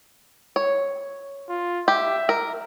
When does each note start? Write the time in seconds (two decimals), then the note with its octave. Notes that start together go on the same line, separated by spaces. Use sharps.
0.56 C#5
1.49 F4
1.88 G4 E5
2.29 A#4